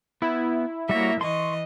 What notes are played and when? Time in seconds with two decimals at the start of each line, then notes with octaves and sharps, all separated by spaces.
0.22 B3 E4
0.89 G3 A#3 F#4 C#5 E5
1.21 E3 D#5 C6 C#6